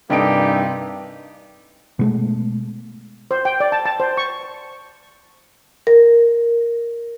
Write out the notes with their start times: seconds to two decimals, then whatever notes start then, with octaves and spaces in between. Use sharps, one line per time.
0.10 G2 C3 E3 A#3 D#4 G4 A4 D7
1.99 B2 G#3 A3
3.31 C5
3.45 G5
3.60 D5
3.72 A5
3.85 A5
4.00 C5
4.17 C#6
5.87 A#4